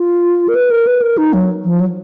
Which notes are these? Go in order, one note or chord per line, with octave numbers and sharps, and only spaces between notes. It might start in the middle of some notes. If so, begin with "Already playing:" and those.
Already playing: F4
A#4
B4
A#4
B4
A#4
D#4
F#3
F3
F#3